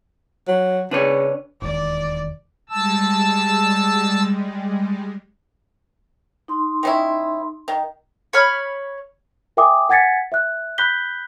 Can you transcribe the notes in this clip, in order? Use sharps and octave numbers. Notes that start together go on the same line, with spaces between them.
F#3
C#3 D4 B4 C#5
E1 D#2 D5
G3 G#3 A5 E6
D#4 C6
D#3 C#4 E4
D#3
C#5 B5 F6
A#4 E5 G5 G#5 D6 D#6
F#5 G#5 G#6 A6 B6 C#7
E5 F#6
B5 F#6 G6 B6 G7